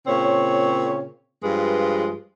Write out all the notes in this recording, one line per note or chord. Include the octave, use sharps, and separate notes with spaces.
A#2 C#3 C4 C#5
G2 F3 G#3 F4 B4